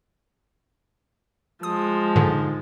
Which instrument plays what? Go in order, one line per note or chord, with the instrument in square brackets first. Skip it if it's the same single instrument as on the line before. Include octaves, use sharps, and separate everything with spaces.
[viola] F3 G#3 [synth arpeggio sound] D#6
[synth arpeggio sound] G#2 D3